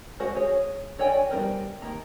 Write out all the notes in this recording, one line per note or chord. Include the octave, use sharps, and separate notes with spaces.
G#3 F#4 C5 F5 F#5
G#4 C#5
F#4 C#5 D5 G5 G#5
G3 B3 D#4 A#4 C5
D#3 A#3 A#5